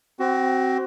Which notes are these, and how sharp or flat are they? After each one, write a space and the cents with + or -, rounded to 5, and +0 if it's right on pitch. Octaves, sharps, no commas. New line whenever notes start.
C4 +0 F#4 +25